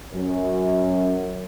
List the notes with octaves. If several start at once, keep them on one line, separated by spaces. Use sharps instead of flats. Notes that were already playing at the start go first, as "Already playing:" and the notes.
F#2